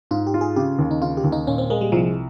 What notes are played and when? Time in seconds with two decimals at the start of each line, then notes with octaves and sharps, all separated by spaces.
0.11 G#2 F4
0.27 G4
0.34 F4
0.41 G#4
0.56 C#3 G4
0.79 D#2
0.91 D#4
1.02 C#3 F4
1.17 G4
1.24 D#2
1.32 D#4
1.47 A#2 C#4
1.58 C4
1.70 G#3 A#3
1.81 G3
1.92 C2 F3